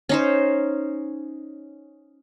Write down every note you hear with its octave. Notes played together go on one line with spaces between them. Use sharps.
C#4 D#4 C5